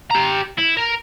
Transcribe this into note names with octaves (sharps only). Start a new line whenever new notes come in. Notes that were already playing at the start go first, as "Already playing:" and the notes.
G4 A#5
E4
A#4